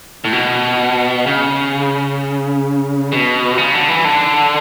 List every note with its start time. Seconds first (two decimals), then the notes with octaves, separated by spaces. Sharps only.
0.25 A2
0.33 B2
1.26 C#3
3.12 B2
3.58 C#3
3.74 D3
3.89 E3
4.05 D3